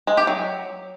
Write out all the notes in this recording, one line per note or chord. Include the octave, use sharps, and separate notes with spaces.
G#3
G4
F#3